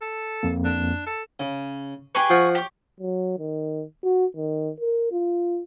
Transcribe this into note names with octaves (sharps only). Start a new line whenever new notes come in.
A4
F2 A#3
D4
A4
C#3
G4 G#4 B4 G#5 C#6
F3 F#5
G4 C#5
F#3
D#3
F#4
D#3
A#4
F4